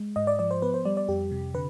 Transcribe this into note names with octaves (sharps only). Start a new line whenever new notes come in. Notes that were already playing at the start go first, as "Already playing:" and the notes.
Already playing: G#3
G#2 D#5
D5
F3 D5
C5
B3 B4
C5
G3 D5
D5
F2 G4
C3
D3 B4